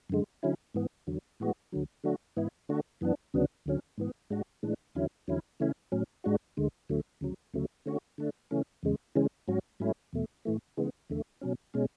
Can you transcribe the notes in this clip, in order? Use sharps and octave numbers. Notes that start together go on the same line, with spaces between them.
F#2 D3 G#3
D3 F#3 C#4 E4
G#2 E3 B3
E2 D3 F#3
A2 E3 G#3 B3 F#4
D2 D3 F#3
D3 F#3 A3 D4 F#4
G#2 E3 B3 E4
D3 A3 D4 F#4
F#2 E3 B3 D4
D2 C#3 F#3 B3 D4
D2 D3 F#3 C#4
G#2 E3 B3
G#2 G#3 D4 F#4
A2 E3 G#3 D4
E2 D3 F#3 C#4 E4
E2 D3 F#3 C#4 E4
C#3 E3 A3 C#4 E4
A2 F#3 C#4
G#2 G#3 D4 F#4
D2 D3 G#3
D2 D3 F#3 A3
D2 C#3 F#3
D2 C#3 F#3 A3
D3 A3 C#4 F#4
D3 A3 D4
C#3 E3 A3 C#4
E2 C#3 G#3
C#3 E3 G#3 C#4
G#2 F#3 C#4 F#4
G#2 F#3 A3 C#4 E4
E2 B2 A3
A2 E3 A3
C#3 E3 G#3 B3
E2 D3 A3
B2 F#3 C#4
B2 G#3 C#4